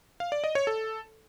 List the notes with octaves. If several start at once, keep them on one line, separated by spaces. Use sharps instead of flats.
F5
D5
D#5
C#5
A4